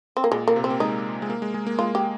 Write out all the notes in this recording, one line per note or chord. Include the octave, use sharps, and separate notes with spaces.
C4
A#3
A#2 G#3
A#3
C3
C4
A#3
G#3 D#4
G#3
A#3
G#3
G#3
A#3
G#3 F4
G4